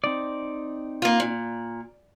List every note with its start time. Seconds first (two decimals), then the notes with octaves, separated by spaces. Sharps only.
0.04 C4 D#4 D5
1.02 A#3 F4
1.20 A#2